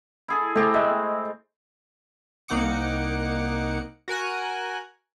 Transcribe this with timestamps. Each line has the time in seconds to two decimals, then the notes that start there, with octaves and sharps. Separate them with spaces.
0.28 E4 G#4 A4
0.55 A3 C4 G4 G#4
0.74 G#3 A3 D#5 E5
2.48 C2 A#3 D#4 F#5 D6 C#7
4.08 F#4 A#4 G#5 F#6